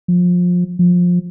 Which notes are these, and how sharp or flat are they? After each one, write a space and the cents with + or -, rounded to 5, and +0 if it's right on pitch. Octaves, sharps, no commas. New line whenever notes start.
F3 +25
F3 +20